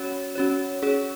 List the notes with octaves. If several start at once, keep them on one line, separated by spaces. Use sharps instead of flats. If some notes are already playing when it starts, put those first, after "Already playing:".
Already playing: C#4 F#4 C#5
C#4 F#4 C#5
C#4 G#4 C#5